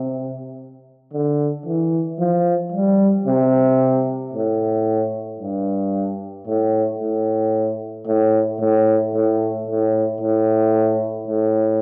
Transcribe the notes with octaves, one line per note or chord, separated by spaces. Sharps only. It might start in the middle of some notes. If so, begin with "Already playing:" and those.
Already playing: C3
D3
E3
F3
G3
C3
A2
G2
A2
A2
A2
A2
A2
A2
A2
A2